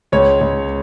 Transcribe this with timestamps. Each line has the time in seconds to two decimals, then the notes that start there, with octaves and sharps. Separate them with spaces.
0.12 C#2 C#5
0.41 C#2